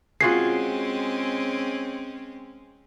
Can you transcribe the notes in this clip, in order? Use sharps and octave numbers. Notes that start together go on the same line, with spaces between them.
G#3 C4 C#4 F4 F#4 G#4 C7